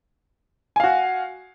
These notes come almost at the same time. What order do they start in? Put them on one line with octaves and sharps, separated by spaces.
G#5 F5 F#4